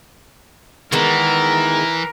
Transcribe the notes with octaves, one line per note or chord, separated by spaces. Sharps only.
D#3 E3 G#3 B3 A#4